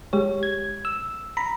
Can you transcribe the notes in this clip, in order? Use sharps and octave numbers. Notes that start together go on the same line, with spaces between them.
G#3 G4 C#5
G#6
E6
A#5 B5